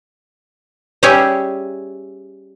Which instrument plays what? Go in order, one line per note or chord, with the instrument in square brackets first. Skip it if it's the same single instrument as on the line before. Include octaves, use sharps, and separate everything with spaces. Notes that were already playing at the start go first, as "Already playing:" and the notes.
[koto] G3 C#4 G4 G#4 C#5 E5